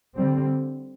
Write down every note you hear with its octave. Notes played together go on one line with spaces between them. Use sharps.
D3 G3 C4